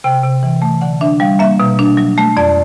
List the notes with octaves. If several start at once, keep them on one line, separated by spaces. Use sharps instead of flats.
C3 G5
C3
E3
A3
D3 F#5
D4 E5
G3 F5
A#3 E5
B2
D4
F#3
A3
F2 D5